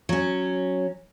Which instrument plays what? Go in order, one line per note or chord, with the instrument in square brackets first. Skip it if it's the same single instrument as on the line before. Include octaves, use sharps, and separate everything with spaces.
[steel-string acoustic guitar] F#3 C#4